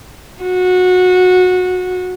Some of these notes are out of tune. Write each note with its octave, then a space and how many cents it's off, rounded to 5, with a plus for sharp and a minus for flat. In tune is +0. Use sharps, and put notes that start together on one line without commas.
F#4 -20